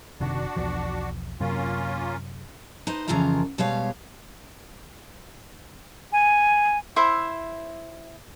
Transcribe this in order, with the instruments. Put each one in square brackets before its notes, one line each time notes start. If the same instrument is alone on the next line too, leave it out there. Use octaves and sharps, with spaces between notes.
[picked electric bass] F#1 C3 D#3 [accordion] D4 F#4
[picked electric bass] B1 E2 F3
[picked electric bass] F#2 C3 F#3 [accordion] A#3 C#4 F4
[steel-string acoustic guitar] D#4 B4 C5 D#5
F2 C#3 E3 F4 A#4 A#5
B2 G3 G#3 C#5 F5
[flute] G#5
[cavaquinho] E4 C5 E5